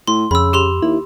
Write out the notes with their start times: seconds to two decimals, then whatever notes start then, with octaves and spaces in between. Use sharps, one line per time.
0.07 A2 C6
0.31 F2 C#3 B5 E6
0.53 G4 C6 F7
0.82 D#2 E4